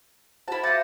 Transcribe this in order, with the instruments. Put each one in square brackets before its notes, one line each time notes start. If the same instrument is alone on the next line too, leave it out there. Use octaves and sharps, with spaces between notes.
[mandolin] E4 A5 [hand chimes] F#4 C5 F#5
[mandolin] F4 F#5 [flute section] E5 D6 [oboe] A5 [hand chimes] G6 A#6